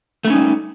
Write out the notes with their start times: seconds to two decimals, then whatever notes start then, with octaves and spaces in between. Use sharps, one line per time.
0.25 A3
0.27 B3
0.30 C#4
0.33 D#4
0.36 G3